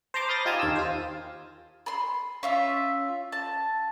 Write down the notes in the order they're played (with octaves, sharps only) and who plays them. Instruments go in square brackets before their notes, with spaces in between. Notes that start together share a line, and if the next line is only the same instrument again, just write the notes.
[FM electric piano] C5 A5 A#5 C6 D6
B5 D#6 F6 G6 A6 A#6
D#4 F4 G4 G#5 A5 D#6
D#2 F5 A5 E6
F4 C5
[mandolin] B5 C6
C#4 F4 E5
A5